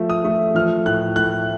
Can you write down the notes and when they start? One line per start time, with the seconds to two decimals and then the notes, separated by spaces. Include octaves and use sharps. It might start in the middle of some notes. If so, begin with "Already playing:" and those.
Already playing: F3 A3
0.10 D#6
0.24 A3
0.55 F3 F6
0.86 A2 F#6
1.16 A2 F#6